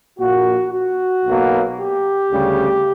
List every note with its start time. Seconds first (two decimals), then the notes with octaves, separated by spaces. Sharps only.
0.18 A#1 A#2 A#3 F#4
0.72 F#4
1.26 B1 B2 F#3 A#3
1.79 G4
2.31 D2 C#3 G3